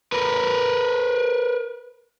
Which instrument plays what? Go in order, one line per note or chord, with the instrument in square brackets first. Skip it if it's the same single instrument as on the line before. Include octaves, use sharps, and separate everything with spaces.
[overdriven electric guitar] A#4 B4